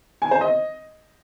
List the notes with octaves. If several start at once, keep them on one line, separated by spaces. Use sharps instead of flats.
G#5
C5
D#5